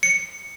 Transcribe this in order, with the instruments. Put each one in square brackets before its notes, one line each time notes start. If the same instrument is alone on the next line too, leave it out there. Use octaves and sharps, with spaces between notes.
[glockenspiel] C#7